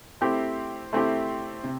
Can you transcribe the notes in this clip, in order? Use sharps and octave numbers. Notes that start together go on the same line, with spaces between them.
A3 C4 E4 G4
A3 C4 E4 G4
C3